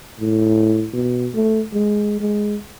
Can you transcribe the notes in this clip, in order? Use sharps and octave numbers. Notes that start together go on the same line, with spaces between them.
A2
B2
A3
G#3
G#3